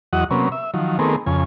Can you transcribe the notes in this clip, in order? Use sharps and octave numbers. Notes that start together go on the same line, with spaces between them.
E2 F#3 F#4 D#5 F#5
C3 F#3 A#3 B3 C#4
E5
D#3 F3 F#3
D#3 A3 B3 C4 G#4 A#4
F2 C#3 G#5